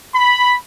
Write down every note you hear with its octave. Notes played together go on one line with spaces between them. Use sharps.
B5